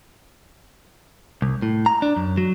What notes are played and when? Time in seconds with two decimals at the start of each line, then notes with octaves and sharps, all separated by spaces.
1.42 C2
1.62 A2
1.86 A#5
2.02 D4
2.16 F#2
2.37 F#3